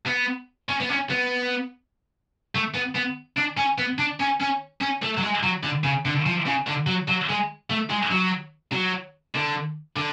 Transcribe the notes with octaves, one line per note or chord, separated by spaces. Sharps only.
B3
C#4
B3
C#4
B3
A3
B3
B3
D4
C#4
B3
D4
C#4
C#4
C#4
A3
F#3
G#3
F#3
D3
C#3
D3
F3
C#3
D3
F#3
F#3
G#3
A3
G#3
F#3
F#3
D3
D3